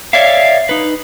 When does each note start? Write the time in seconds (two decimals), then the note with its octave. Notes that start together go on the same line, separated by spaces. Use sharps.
0.13 C#5 D5 E5 F5
0.69 D#4 B4